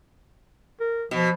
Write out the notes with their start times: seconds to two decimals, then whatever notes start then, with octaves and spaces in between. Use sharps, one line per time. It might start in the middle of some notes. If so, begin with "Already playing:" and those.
0.80 A#4
1.11 B2 F3